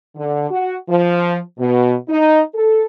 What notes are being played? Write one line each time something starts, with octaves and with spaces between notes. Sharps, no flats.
D3
F#4
F3
B2
D#4
A4